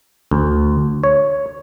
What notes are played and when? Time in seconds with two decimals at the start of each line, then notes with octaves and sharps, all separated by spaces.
0.31 D2
1.04 C#5